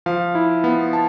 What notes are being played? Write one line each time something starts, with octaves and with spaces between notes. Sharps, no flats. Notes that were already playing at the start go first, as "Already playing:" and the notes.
F3 F5
E4
B3
A5